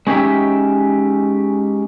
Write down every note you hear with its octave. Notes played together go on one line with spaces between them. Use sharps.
G#3 C#4 D#4 G4 E5